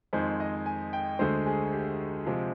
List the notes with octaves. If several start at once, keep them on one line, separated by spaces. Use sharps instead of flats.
F2 D#3 G#3 C5
D#5
G#5
G5
D2 D3 G#3 C5
G#4
G4
C3 F3 G#3